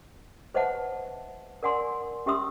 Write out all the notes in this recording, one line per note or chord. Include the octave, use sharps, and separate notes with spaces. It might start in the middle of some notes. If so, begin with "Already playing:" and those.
B4 C5 D#5 E5 F#5 A5
A#4 D5 F#5 G#5 C6
C#4 G4 E5 C6 D#6 E6